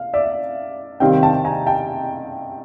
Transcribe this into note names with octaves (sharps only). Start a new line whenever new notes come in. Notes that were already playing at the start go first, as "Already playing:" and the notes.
Already playing: F5
D5 E5
C3 D#3 G3 C4 F5 G5
G5 A5
G#5 A#5
G5 A5